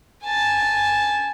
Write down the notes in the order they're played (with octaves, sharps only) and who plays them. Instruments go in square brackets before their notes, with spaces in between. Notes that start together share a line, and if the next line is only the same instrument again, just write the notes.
[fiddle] G#5 A5